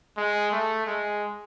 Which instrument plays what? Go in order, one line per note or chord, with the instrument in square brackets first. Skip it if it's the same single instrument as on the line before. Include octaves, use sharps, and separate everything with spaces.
[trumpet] G#3
A3
G#3